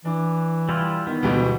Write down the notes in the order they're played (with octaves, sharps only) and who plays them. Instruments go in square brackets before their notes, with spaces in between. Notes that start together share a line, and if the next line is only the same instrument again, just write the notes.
[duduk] E3 [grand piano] D4
[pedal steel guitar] G3 E4 F4
[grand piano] D#3 [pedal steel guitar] B3
[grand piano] D2 E3 G3 [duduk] B2